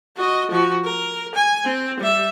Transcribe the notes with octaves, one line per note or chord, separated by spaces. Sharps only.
F#4 D#5
F3 F#4
A#4
G#5
C4
G3 E5